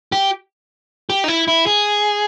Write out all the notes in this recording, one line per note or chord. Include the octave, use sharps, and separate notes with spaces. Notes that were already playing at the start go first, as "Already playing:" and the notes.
G4
G4
D#4
E4
E4
G#4